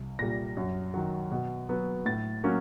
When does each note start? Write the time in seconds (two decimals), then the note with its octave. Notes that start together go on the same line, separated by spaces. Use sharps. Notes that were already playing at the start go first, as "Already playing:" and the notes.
Already playing: C2
0.19 A#2 G3 A#6
0.57 F#2
0.94 D#3 F#3
1.32 B2
1.69 F#3 B3
2.05 A2 A6
2.44 F#3 A#3 C#4